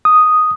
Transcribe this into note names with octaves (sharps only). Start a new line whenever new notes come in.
D#6